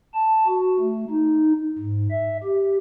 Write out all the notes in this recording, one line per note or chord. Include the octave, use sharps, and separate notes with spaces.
A5
F#4
A3
D#4
G#2
E5
G4